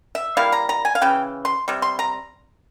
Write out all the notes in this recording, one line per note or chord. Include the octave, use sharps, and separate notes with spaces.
E5
G3 A#3 E4 F5
A#5
A#5
G#5
F5
C#3 E3 G5
C6
C3 G3
C6
A#5